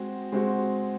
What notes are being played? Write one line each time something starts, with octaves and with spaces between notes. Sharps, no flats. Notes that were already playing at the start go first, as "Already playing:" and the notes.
Already playing: G#3 C4 F#4
G#3 C4 F#4